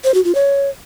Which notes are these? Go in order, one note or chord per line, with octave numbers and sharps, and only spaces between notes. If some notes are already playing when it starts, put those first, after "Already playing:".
C5
F#4
F4
C#5